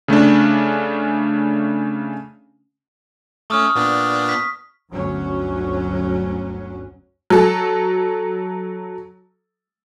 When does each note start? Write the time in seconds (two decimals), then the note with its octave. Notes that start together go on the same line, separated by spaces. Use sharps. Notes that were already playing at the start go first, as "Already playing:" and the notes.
0.08 C#3 A3 C#4 D4
3.50 A3 C#4 C#6 D#6 F6
3.75 A#2 B3 D4
4.29 B6
4.91 G1 D2 F#3 C#4
7.30 F#3 A4